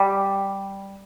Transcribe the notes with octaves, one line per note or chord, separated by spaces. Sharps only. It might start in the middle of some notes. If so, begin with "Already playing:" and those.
Already playing: G3